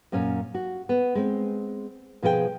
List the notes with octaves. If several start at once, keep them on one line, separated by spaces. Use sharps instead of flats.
F#2 A#2 C#4
F#4
B3
G#3 C4
B2 F3 G#4 A#4 G5